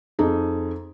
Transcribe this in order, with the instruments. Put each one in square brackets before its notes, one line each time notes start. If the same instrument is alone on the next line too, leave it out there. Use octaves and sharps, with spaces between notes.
[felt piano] F2 D#4 G#4